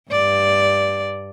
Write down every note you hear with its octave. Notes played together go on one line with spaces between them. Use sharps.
G2 D5